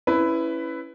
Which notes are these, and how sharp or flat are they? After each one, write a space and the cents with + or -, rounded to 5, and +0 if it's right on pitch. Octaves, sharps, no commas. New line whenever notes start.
C#4 +0 E4 +0 B4 +15